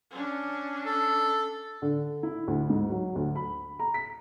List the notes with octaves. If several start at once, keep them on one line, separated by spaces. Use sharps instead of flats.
C#4 D4
A4
D3
E4
D2
G#2
F#3
D2
B5
A#5
B6